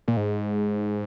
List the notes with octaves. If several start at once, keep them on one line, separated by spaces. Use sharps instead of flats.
A#2
G#2